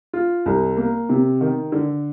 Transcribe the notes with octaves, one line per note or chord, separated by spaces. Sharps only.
F4
C2
A#3
C3
D#3
D3